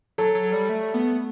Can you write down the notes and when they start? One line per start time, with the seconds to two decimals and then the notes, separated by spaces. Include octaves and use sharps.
0.18 F#3 A4
0.35 F#3
0.53 G3
0.69 A3
0.94 B3